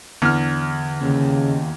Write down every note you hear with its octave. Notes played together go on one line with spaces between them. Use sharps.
E2 D3 F6
D#2 C#3